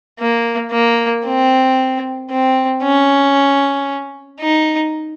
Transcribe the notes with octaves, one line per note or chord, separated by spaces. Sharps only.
A#3
A#3
C4
C4
C#4
D#4